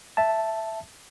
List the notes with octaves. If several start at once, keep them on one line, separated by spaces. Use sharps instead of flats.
E5 A5